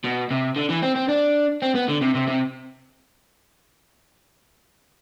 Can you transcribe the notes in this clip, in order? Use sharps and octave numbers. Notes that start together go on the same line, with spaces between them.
B2
C3
D3
E3
C4
C4
D4
C4
B3
D3
C3
C3
C3